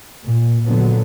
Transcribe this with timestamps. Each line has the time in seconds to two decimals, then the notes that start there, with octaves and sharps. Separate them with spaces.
0.23 A#2
0.65 A#2 D3 F#3 B3